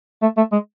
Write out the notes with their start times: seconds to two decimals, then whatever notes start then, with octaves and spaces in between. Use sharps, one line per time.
0.22 A3
0.37 A3
0.52 G#3